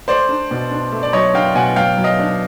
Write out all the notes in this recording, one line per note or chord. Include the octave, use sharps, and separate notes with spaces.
A3 C5 D5
D4
B2
D4
A3
D5
F#3 C#5 D#5
D4 F5 G5
B2 F#5 G#5
F#3 F5 G5
F#3
D#5 F5
D4